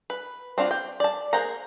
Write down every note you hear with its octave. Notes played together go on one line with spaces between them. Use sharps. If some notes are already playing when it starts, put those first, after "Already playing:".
B4
C4 D4 F4 F#4
G5
D5 A5
A#3 G#4 C5 F#5 A#5